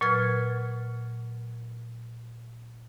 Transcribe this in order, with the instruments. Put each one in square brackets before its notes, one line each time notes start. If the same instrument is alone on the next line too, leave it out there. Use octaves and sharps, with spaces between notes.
[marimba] A#2 F#3 B4 F6 G#6